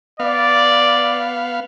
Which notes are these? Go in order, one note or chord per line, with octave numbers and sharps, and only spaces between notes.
B3 D5 F5